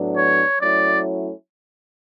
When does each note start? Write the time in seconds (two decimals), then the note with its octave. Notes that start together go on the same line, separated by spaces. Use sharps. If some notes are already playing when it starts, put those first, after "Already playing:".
Already playing: A2 F#3 B3 D4
0.17 C#5
0.61 F#3 A3 C#4 E4 D5